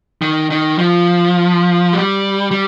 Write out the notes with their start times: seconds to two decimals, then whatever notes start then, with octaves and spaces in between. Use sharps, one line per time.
0.22 D#3
0.50 D#3
0.79 F3
1.93 G3
2.51 G3